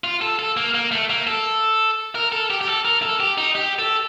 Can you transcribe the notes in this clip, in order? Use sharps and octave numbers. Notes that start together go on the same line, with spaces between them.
F4
A4
A4
A#3
A#3
A3
A#3
A4
A#4
A4
G4
G4
A4
A#4
A4
G4
D#4
G4
A4